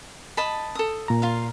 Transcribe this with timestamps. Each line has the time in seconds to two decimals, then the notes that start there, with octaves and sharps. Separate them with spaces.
0.37 D#5 A5 B5
0.75 A4 D#6
1.08 A#2 A#5
1.22 F4 F5